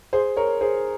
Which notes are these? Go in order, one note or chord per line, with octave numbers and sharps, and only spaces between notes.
G#4 C5
A#4 C#5
G#4 C5